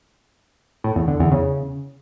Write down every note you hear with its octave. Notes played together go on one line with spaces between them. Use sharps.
A2
E2
D3
E2
C#3